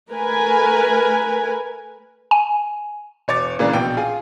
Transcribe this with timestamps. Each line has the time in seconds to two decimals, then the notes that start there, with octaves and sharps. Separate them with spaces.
0.11 A3 A#4 B4 G#5
2.31 G#5
3.28 E1 C#5 D6 A6
3.59 A#2 C#3 E3 A#3 D4
3.73 A#1 B2 G5
3.97 F4 G#4 G#5